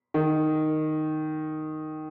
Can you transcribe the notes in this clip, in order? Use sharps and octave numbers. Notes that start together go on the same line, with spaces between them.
D#3